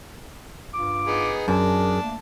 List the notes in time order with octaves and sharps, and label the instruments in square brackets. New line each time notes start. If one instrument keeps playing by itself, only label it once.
[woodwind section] G2 F4 D6
[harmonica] B3 D#4 G#4
[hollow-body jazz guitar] F#2 [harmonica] D4 A5 [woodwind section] G#4 A#4
[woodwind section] A3 A#3